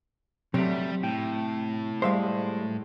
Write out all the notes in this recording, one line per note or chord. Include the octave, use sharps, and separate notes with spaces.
C3 F#3 G3 A3
A2 G5
G3 G#3 C5 E5 F5